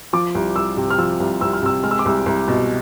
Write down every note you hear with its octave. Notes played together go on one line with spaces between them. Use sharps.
F3 D6
C2
C2 E6
C3
F6
F3 E6
C2
C2 E6
F6
C3 E6
G#3 F6
E6
D6
C2 E6
C2
B2